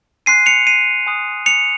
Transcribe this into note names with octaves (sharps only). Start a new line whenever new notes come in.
G#5 C6 F#6 C7 D#7
C#7 F7
C7 D#7
G#5 C6 D#6 F#6
C#7 F7